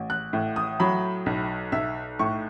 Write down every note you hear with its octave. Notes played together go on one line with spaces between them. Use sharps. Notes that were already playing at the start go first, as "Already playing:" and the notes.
Already playing: A1
F#6
A2
D#6
F#3 B5
B1
B1 E5
A2 C#6